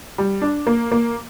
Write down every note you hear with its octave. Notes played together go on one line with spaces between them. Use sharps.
G3
D4
A#3
A#3